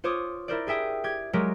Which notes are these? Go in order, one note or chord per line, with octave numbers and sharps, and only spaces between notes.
F4 C5 C#5 D6 D#6
E4 A#4 C5 D5
G4 G#4 E5 G5 D#6
G4 G#6
F#3 G#3 G4 A#4